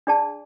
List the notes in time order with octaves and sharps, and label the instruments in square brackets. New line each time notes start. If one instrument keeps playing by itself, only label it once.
[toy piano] D4 G#4 D5 A5